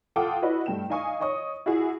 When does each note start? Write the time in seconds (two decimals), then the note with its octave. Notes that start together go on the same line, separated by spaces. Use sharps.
0.16 F4 A4 F#5 G5 D6 D#6
0.42 E4 F#4 B4 D#5
0.66 G2 A3 G5 E7
0.90 D#4 D#5 F5 G#5 C#6 D#6
1.20 C#5 D#5 C#6 D#6
1.66 E4 F#4 G#4